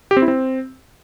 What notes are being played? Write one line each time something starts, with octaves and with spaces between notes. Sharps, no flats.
G4
C4
E4
C4